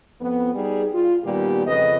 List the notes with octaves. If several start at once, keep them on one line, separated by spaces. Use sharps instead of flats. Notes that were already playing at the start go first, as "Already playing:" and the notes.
F2 B3
G3 D#4 G#4
F4
A#2 D#3 G3 B3 G4
F2 C#3 B4 D#5